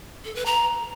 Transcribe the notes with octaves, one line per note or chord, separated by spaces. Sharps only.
A4
B4
A#5